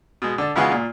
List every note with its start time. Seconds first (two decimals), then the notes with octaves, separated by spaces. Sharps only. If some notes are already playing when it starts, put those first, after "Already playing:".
0.22 B2 G#3
0.38 D3 A5
0.56 C#3 E3 G#3 B3 F4 F#4
0.72 A#2